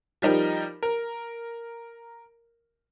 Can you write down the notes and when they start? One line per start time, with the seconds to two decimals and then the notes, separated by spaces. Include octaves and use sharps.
0.22 F3 G3 D#4 A#4
0.83 A#4